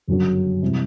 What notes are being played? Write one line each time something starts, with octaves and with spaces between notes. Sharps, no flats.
G1 F#2 C#3 F#3
C3 E3 G3